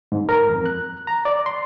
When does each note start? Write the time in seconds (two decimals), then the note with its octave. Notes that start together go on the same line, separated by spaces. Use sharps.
0.12 G#2
0.29 A#4
0.50 F2
0.66 F#6
1.07 A#5
1.25 D5
1.46 C6